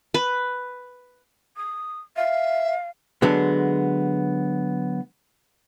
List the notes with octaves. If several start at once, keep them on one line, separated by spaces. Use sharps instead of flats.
B4
D#6
E5 F5
D3 F#3 G#3 B3